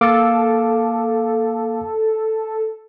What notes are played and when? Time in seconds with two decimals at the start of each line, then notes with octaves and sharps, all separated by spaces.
0.01 A#3 A4 F5 D6